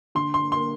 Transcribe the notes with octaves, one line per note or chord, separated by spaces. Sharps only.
D3 C6
C6
A#3 C6